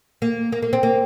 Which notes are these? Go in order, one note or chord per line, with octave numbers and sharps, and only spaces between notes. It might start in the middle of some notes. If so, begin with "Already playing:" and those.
A#3
A#3
A#3
C4
A#3